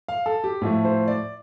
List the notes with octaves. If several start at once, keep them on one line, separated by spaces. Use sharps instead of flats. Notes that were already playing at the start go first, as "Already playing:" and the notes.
F5
A4
G4
A2 F3 A3
C5
D5